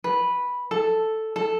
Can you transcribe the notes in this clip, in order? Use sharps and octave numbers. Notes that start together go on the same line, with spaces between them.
B4
A4
A4